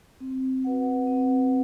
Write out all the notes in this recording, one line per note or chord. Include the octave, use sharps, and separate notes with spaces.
C4
F#4 B4 F#5
C4